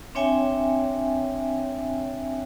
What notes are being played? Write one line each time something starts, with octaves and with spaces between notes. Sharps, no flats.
C4 D4 C#5 E5 G5 G#5